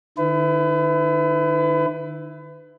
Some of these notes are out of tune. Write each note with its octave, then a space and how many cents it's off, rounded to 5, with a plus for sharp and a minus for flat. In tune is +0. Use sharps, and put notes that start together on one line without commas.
D#3 -45 E4 +0 B4 +30